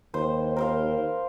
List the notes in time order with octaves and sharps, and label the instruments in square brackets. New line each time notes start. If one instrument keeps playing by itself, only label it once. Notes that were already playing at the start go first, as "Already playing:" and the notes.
[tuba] D#2 [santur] C5
[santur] A#4 C5 F5